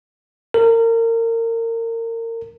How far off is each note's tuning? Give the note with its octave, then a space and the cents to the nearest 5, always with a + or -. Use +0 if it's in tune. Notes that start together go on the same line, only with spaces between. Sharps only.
A#4 -30